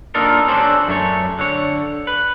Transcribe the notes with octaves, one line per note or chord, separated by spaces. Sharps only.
A#3 D4 D#4 F4 A4 A#4
C#4 D4 F#4 A4 C5
F#2 A3 C#5
D3 C#5
B4